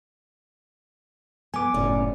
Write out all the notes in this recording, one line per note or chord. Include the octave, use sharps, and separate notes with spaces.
B3 G#5 D6
F#1 A2 C#4 D5